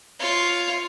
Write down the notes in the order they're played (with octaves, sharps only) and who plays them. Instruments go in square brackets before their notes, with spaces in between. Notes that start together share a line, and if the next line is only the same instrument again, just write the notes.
[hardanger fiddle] F4 C#5